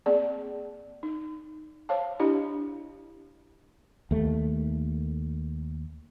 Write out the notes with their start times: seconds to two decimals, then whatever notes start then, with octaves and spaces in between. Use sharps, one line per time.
0.06 A#3 C4 G#4 D5
1.03 D#4
1.89 C5 C#5 F5 A5
2.19 D4 E4 G4 D#5
4.11 D#2 A3